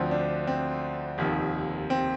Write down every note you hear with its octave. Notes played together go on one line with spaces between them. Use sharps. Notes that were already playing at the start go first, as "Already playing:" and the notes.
Already playing: D2 D3 F3 C4
D4
C4
F1 D#2 D#3
C4